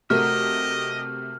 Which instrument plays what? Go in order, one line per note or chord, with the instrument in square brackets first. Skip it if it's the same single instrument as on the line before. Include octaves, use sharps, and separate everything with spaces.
[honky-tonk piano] C3 A3 [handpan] F#4 A#4 [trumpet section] G4 D#5 [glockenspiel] F6